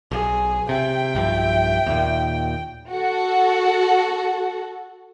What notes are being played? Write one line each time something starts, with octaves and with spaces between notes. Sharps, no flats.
B1 G#4
C3 E5 G5
B1 G2 F3
D#2 A#2
F#4 A4